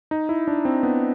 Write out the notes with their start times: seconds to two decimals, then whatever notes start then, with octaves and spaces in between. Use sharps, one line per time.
0.11 D#4
0.29 E4
0.48 D4
0.65 C4
0.83 B3